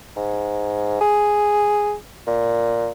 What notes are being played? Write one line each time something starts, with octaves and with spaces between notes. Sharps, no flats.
G#2
G#4
A#2